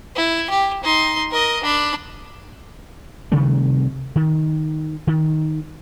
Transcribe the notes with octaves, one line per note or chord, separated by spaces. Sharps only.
E4
G4
D#4 C6
A#4 D#5
D4 B5
C3 D#3 G3 A3
D#3
D#3